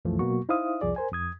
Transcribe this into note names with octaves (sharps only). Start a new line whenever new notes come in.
C2 F#2 E3 F3 A3
B2 F#3 A#3 F#4 C#6
D#4 E4 C5 E5 F5 D#6
C2 F2 F3 G#4 D5
A#4 C5 G#5
F2 D#6 G#6